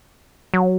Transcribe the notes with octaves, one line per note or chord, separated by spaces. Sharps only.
F#3